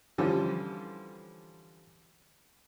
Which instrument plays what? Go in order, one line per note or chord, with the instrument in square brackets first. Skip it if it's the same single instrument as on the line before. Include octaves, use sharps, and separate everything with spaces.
[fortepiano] D3 E3 F3 G3 C#4 A4